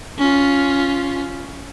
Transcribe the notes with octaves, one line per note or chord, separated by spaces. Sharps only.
C#4 F4